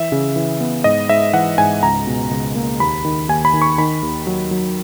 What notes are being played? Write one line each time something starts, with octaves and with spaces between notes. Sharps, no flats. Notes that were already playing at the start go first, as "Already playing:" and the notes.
Already playing: E3 E5
C#3
E3
B3
G#2 D#5
G#2 E5
E3 F#5
G#2 G#5
C#2 A#5
B2
C#2
A#3
D#2 B5
D#3
D#2 G#5
B5
D#3
C#6
D#3 B5
D#2
F#3
F#3